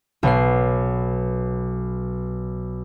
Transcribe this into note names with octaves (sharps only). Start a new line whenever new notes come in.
B1 B2 C7